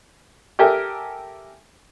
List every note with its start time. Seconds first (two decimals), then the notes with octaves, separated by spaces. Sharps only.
0.59 G4 A4 A#4 E5 G5 G#5